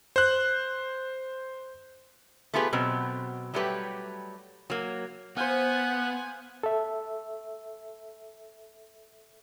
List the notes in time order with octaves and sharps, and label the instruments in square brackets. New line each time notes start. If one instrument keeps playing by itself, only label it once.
[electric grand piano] C5 F#6
[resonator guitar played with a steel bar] A3 B3 F4 G4 G#4 B4
B2 F#3 C4
F#3 G3 A3 G4 B4
F#3 A#3
[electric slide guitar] B3 [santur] C5 F5 [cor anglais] F#5 [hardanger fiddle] G#5
[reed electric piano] A4 E5